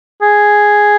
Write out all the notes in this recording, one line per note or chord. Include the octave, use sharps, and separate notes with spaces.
G#4